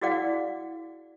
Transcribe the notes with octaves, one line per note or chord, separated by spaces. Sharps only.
E4 F#4 G#4 D5 F5 F#5